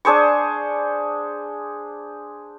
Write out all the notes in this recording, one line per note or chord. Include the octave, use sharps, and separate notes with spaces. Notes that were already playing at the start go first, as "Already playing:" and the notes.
D4 G#4 C5 C#6